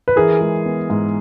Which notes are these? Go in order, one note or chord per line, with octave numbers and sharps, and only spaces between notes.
B4
E3 G#4 A#4
G#3
B3
G#2